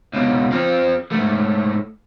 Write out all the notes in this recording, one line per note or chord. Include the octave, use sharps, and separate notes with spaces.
C#2 B2
F3 C4
G#2 A3